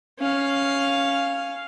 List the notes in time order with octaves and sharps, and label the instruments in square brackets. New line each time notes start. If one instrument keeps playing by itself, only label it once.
[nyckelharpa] C#4 F5